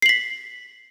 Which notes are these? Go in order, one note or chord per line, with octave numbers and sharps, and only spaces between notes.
B6 C7 F#7